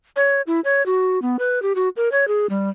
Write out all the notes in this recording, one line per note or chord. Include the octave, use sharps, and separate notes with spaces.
C#5
E4
C#5
F#4
B3
B4
G4
F#4
A#4
C#5
G#4
G3